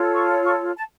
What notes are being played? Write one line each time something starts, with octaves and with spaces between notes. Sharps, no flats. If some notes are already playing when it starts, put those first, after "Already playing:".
Already playing: F4 A4 C#5
C#6
C#6
A5